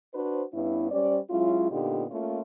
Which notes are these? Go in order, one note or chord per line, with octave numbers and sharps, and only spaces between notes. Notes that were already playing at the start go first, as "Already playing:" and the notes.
D4 F#4 B4 C5
G2 B3 C#4 E4
G3 C#4 G4 C5 D5
F#3 G#3 C#4 E4 F4
A#2 D3 B3 D#4 F4 G4
A3 A#3 C#4 F4